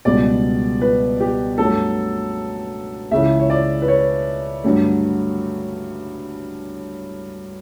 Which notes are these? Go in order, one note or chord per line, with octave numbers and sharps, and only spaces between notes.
C#2 B2 G3 D5
B4
G4
G2 F#3 A3 A4
C#2 C#3 E3 E5
C#5
D5
B4
C#5
G2 D3 F#3 A3